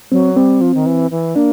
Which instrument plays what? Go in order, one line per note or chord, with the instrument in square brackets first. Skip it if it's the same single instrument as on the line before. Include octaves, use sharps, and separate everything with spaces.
[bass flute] F#3 [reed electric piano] C4
[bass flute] G3 [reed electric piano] C4
[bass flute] F3
D#3
E3
E3
[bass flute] A#3 [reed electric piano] D4